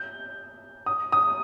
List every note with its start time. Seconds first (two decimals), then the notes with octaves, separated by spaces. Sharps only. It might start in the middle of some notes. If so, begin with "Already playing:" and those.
Already playing: G6
0.86 D#6
1.12 D#6